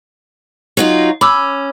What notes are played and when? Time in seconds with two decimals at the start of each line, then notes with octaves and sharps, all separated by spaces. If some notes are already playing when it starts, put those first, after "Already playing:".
0.77 F#3 D#4 F4
1.21 C#4 B5 D6 E6